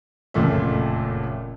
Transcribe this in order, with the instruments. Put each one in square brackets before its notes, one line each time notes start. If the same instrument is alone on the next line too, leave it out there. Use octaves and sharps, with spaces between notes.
[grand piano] F#1 F2 A#2 A3 E5